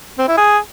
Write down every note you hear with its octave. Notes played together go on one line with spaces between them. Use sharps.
C4
E4
G#4